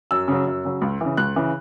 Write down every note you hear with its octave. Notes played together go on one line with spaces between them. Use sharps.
F#2 E6
C#3 F#3
F#2
C#3 F#3
C#2
C#3 E3
C#2 F#6
C#3 E3